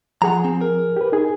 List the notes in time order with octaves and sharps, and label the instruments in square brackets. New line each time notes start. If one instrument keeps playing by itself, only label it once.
[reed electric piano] F3 G#4 [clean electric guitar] F#5 A#5
[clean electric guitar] C4
A#4
[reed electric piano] G4 B4
D#4 G#4